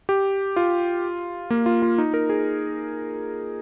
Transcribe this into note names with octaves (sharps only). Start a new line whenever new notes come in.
G4
F4
A#3
F4
F4
D#4
A#4
G#4